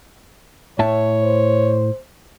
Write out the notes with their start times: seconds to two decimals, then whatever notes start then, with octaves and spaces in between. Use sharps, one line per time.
0.79 A2 C#5 E5 A5
1.23 C5